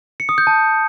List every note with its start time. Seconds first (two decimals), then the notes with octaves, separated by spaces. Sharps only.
0.20 C#7
0.29 D#6
0.38 G6
0.47 A5